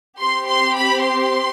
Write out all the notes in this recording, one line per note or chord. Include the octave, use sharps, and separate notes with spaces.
C4 G4 C6
C6
B5
C6